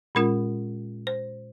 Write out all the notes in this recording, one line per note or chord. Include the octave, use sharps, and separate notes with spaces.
A#2 G#3 C#4 F4 A#4
C5